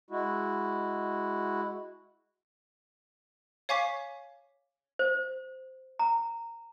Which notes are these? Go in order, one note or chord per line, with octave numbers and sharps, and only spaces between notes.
G#3 E4 F#4
C#5 F5 G#5 C#6 D6 B6
C5
A#5